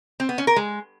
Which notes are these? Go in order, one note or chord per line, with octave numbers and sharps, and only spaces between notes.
C4
B3
C#4
A#4
G#3